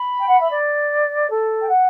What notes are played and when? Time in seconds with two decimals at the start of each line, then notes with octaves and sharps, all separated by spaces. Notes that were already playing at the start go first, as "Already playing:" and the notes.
Already playing: B5
0.19 G5
0.28 F#5
0.40 E5
0.50 D5
1.28 A4
1.60 G5
1.68 F#5